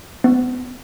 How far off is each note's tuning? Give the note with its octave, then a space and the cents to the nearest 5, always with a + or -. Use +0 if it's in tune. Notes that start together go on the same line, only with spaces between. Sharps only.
B3 +25